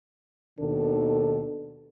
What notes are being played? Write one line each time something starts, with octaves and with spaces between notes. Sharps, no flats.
D#2 B2 D#3 D4 A4